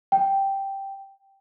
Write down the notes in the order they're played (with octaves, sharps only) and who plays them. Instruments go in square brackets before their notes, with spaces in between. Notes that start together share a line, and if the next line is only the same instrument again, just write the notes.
[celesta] G5